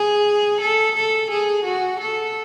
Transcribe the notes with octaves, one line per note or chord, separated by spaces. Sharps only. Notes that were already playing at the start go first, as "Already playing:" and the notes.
Already playing: G#4
A4
A4
G#4
F#4
A4